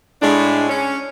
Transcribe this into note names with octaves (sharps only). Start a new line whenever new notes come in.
A2 G#3 D4
C#4